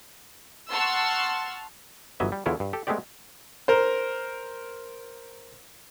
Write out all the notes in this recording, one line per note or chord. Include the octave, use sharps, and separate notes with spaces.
F#5 A5 C6 C#6 E6 F6
G1 E3 F#3 D#5 E5
G3
E2 D3 E4 F4 C#5
G2
G4 A4
G#3 A3 B3 C4 G4 D5
A#4 C5